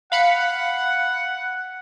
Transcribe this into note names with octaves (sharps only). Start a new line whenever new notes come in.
F5 F#5 B5 C#7